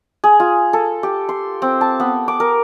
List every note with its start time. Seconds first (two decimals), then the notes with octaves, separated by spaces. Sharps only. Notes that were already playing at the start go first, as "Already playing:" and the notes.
0.24 G#4
0.40 F4
0.73 A4
1.03 G4
1.29 C6
1.62 C4
1.81 A5
2.00 B3
2.28 D6
2.40 A#4